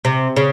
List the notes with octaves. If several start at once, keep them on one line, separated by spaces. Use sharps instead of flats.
C3
C#3